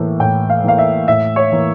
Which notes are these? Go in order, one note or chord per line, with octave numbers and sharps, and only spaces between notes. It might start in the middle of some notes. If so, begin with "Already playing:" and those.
Already playing: A2 E3 A#3
A2 G5
F5
E3 A#3 F5
E5
A2 E5
C#5
E3 A#3